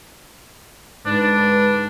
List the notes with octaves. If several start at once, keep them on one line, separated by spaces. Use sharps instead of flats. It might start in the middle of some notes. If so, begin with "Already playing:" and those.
G#2 D3 D4 B4